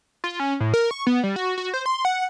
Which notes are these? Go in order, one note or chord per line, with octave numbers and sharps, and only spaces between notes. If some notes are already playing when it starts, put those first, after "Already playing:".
F4
C#4
A2
A#4
C#6
B3
G3
F#4
F#4
C5
C6
F#5